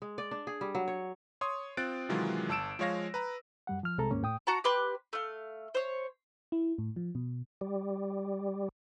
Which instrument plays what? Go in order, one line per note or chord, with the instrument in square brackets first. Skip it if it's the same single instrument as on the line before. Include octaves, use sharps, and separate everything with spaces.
[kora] G#3
D5
D4
G#4
G3
F#3
C#5
[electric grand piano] C#5 C6 C#6 D#6
C4 F4 F#6 A6 D7
C3 D#3 E3 F#3 G#3 F4
G1 A5 E6 D7 E7
F3 G#3 C#5 F5 A#6
B4 A#5
[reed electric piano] F#2 G3 F#5
F3 F6
C2 C3 G#3 A4 A#5
D#2 G#2 A#3 C#4
A2 G5 D#6
[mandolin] F#4 F#5 A5 A#5
G4 B4 C6 F#6
A3 F5
C5 C#5
[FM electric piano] E4
A2
F3
B2
[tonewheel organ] G3